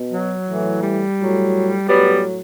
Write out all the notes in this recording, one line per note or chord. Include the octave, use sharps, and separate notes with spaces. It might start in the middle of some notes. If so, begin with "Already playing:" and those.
Already playing: B2
F#3
A2 E3
G3
A2 F#3
A2 F#3 G3 B3